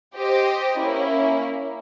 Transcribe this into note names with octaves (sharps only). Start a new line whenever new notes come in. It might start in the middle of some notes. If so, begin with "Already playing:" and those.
G4 C5 D#5
A#3 C#4 E4